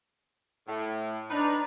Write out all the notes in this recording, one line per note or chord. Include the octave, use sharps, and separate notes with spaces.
A2
D4 D#4 B4 A#5